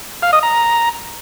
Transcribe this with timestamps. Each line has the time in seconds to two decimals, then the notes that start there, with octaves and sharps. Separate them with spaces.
0.23 F5
0.33 D#5
0.43 A#5